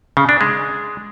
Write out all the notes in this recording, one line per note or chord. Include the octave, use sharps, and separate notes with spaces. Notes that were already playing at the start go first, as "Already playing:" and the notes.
C#3
D4
G#3